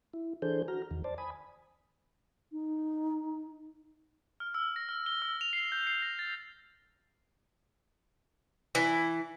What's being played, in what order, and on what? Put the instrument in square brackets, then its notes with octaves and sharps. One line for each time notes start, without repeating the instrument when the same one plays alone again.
[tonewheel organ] E4
E3 D4 G#4 A4 C5 G6
F#4 A#5 F6
E2 D#3
C5 D5 A5
G#5 B5 D#6
[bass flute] D#4
[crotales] F6
E6
A#6
F6
G7
E6
F7
C7
G6
C7
A#6
A6
[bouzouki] E3